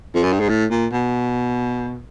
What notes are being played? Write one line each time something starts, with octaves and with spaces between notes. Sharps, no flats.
F2
F#2
G2
G#2
A2
A#2
B2